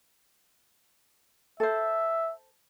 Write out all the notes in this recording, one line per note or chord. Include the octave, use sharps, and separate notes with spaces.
A4 C5 E5